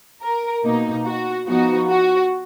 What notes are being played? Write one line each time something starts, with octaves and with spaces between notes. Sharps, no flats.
A#4
B2 A#3 D#4
F#4
F3 B3 D#4 F#4
F#4